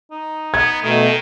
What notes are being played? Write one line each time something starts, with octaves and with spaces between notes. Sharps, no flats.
D#4
B3 G#6
B2 D#3 A3